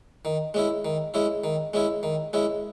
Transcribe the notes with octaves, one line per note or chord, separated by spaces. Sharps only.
D#3
G#3 C#4 E4
D#3
G#3 C#4 E4
D#3
G#3 C#4 E4
D#3
G#3 C#4 E4